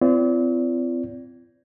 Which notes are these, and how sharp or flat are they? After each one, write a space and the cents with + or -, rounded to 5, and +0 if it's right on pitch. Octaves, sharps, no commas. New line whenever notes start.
C4 -35 F4 -45 D5 -35